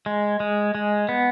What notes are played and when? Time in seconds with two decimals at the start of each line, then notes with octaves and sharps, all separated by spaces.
0.06 G#3
0.40 G#3
0.75 G#3
1.09 B3